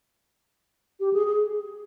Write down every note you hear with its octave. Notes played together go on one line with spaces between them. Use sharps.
G4
G#4
G#4